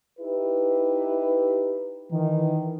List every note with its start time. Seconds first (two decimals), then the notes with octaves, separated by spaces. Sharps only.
0.19 D#4 E4 G4 B4
2.10 D#3 E3